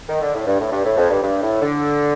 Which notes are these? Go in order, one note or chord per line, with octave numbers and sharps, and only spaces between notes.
D#3
D3
A2
G2
A2
G2
A2
F2
G2
G2
A2
D3